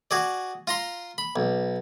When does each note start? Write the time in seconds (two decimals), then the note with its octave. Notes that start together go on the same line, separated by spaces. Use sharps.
0.11 F#4 G#4 D5
0.67 F4 A#5 C6
1.18 B5
1.36 B1